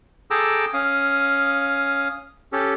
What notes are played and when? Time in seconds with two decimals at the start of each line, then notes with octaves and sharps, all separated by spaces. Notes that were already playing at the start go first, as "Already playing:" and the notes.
0.31 G#4 A4 G5 A#5 D6 E6
0.74 C#4 F5 D#6
2.53 C#4 G4 A4